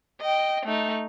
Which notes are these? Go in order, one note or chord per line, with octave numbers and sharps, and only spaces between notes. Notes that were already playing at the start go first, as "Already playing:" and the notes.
D#5 G5
A3 D#4